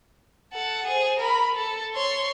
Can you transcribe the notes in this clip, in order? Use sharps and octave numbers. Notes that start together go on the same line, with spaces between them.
A4 F#5
G#4 C5
A#4 B5
A4
C#5 C6